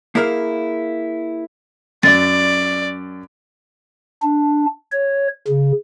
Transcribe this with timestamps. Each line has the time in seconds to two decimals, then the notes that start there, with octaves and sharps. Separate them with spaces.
0.15 A#3 E4 G#4 A#4 B4 F5
2.03 F#2 D5 A6
4.22 D4
4.92 C#5
5.48 C#3